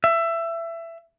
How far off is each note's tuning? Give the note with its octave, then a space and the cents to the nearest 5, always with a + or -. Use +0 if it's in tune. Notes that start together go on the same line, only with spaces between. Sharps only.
E5 +20